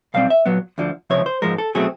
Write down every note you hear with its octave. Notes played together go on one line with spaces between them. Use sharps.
B1 B2 G3 C4 F5
E5
A#2 F#3 B3
D2 D3 F3
C#2 C3 F3 C#5
C5
G#2 F3 G#3 A#4
A4
B2 F#3 A3 C4 G#4